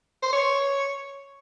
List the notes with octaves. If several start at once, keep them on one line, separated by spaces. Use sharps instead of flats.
C5
C#5